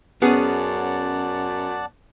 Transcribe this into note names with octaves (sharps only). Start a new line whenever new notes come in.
F#2 B3 C#4 G#4 D5 F#5 A5